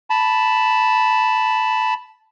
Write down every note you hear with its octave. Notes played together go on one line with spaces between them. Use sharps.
A5 B5